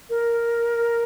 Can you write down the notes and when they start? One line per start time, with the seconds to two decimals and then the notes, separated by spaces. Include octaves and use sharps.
0.10 A#4